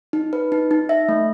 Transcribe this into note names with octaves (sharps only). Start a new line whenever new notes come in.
D#4
B4
D#4
D#4
E5
A3